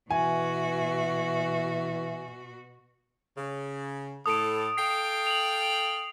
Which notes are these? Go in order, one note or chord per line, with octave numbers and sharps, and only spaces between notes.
B2 E3 F#4 E5 G#5
C#3
A2 A4 D#6 D7
A4 F5 G5 C7
F7 F#7